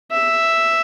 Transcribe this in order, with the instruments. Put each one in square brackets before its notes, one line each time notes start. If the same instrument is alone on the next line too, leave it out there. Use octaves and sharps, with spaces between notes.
[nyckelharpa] E5